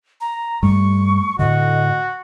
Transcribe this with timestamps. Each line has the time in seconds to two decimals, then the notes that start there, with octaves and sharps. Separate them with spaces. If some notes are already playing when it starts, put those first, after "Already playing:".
0.21 A#5
0.62 G2 G3 A3 C#6
1.39 A2 D3 F#4 D#5